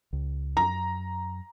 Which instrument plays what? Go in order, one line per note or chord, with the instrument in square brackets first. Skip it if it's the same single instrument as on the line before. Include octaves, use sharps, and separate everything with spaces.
[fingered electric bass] C#2
[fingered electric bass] F#2 [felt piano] A#5